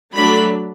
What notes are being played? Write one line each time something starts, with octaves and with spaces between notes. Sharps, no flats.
F#3 A3 D4 B5